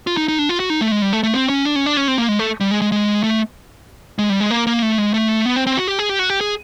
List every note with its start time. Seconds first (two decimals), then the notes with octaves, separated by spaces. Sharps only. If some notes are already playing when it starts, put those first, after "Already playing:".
0.07 F4
0.17 D#4
0.28 D#4
0.39 D4
0.49 F4
0.60 F#4
0.70 D#4
0.81 A3
0.91 G#3
1.02 G3
1.13 A3
1.23 A3
1.34 C4
1.49 C#4
1.65 D4
1.76 C#4
1.86 D4
1.97 C#4
2.08 C4
2.18 A#3
2.29 G#3
2.39 A3
2.60 G3
2.71 G#3
2.82 G#3
2.92 G#3
3.24 A3
4.19 G#3
4.29 G3
4.40 G#3
4.51 A#3
4.67 A#3
4.82 A3
4.98 G#3
5.14 A3
5.45 B3
5.56 C4
5.67 C4
5.77 F#4
5.88 G4
5.99 G#4
6.09 G4
6.19 F#4
6.30 G4
6.41 G#4